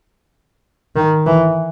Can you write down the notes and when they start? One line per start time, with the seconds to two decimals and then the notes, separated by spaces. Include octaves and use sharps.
0.96 D#3
1.27 E3